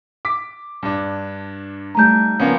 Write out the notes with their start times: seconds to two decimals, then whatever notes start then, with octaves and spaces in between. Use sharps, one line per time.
0.25 D6 B6
0.83 G2 D4
1.95 G3 A3 D#4 A#5 G6
2.40 C#3 F3 A#3 B3 C#4 D5